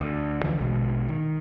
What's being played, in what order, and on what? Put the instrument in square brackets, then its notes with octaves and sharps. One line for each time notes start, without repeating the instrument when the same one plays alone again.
[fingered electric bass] D2
D2 D3 E3 F3
A#1 B2 G#3
D#3